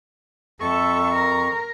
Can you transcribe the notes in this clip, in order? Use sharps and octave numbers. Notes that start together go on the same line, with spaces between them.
F2 A4 E5 C#6
A#4